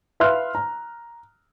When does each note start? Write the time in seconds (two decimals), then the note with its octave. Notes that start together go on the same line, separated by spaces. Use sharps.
0.20 B4 E5 F5 C6 F6 F#6
0.55 A#5